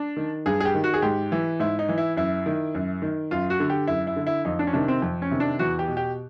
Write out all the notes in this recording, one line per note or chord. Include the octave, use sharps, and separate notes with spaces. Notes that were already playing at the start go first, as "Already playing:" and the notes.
Already playing: D4
D#3
G2 G#4
G#4
G4
D#3
F#4
G#4
G#2 G4
E3
G#2 E4
D#4
E3
E4
F#2 E4
D#3
F#2
D#3
F#2 F4
F#4
D3
G4
F#2 E4
E4
D3
E4
F2 D#4
D4
C#4
C3 D#3 D4
C4
F2
C#4
C3 D#3
D4
E2 F#4
G4
B2
G4